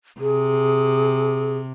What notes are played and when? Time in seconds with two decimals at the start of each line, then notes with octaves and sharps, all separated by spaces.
0.20 C3 G#4